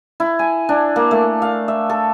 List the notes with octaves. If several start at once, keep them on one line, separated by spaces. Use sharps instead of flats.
E4
G#5
D4
A#3
A3
F5
E5
A4